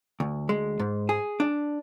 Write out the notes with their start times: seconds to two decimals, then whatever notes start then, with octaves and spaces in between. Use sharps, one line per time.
0.20 D2
0.49 G#3
0.79 G#2
1.09 G#4
1.40 D4